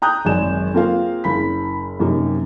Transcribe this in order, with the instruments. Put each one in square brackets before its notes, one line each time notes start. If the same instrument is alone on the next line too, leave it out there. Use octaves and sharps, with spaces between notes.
[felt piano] G5 A#5 D#6 F#6 G6
G#1 F#2 C#3 D5 G#5 E7
A#3 C4 F4 G#4 A#4 F5
F#1 B5 B6
F#2 C3 A#3 D#4